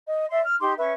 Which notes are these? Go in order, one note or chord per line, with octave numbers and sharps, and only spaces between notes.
D#5
D5 E5 C6
F6
D#4 G4 C6 D6
C#4 B4 E5 C#6